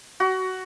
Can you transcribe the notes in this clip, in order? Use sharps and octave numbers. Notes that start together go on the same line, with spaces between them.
F#4